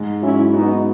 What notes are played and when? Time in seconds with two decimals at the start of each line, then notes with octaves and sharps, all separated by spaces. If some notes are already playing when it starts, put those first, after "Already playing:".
Already playing: G#2
0.22 F#3 C#4 E4
0.53 B3 D#4 F#4